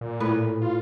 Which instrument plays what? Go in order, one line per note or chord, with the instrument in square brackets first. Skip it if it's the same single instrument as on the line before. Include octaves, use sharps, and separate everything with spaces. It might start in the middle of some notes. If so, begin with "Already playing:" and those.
[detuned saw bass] A#2
[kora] A2 B4
[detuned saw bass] F4